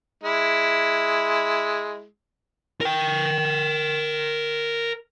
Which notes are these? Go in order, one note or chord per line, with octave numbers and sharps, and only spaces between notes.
G#3 E4
A#4 G5